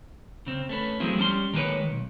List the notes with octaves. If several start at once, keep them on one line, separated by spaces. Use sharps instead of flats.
C#3 C4
A3 C#4 B4
F3 F#3 G#3 A3 C4 E4
G3 C#4 A5 C6
D#3 G#3 A#3 F#4 B4 C#5
B1